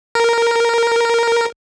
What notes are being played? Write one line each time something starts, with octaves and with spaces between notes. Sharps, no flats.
A#4